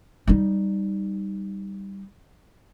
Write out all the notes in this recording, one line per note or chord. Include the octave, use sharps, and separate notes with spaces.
G3 D#4